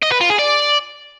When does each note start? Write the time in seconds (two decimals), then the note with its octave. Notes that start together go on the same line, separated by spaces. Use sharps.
0.03 D#5
0.12 B4
0.21 F4
0.30 G#4
0.39 D5